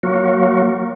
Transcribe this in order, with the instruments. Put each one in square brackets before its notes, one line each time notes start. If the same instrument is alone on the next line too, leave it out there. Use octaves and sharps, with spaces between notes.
[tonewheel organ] F#3 A#3 F#4